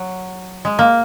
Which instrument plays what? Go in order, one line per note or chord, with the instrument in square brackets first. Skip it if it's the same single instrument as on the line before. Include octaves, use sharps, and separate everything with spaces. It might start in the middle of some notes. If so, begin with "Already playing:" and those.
Already playing: [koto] F#3
G#3
A#3